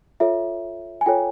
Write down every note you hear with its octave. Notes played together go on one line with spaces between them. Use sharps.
F4 A4 C#5 E5
G#5
F4 A4 C#5 G5